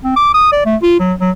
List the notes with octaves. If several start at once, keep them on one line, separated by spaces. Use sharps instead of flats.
C4
D6
D#6
D5
A3
F4
F#3
F#3